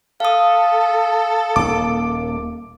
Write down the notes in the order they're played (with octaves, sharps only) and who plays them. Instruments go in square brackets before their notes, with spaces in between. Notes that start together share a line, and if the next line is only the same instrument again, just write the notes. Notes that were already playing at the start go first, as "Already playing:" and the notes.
[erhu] A4 [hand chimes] F5 D#6
[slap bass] D#1 D#2 A#3 [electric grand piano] D6